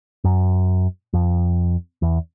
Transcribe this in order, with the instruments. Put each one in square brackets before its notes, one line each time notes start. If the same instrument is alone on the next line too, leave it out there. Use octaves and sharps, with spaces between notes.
[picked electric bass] F#2
F2
E2